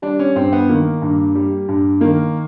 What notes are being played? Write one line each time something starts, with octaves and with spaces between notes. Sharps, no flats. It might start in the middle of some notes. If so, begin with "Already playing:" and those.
G3 D4
C#4
G2 C4
B3
D#3 A#3
G2
G3
G2
D#3 A#3